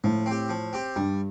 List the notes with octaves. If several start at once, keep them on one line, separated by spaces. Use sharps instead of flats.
A2 F3
C4 G4
F3
C4 G4
G2 G3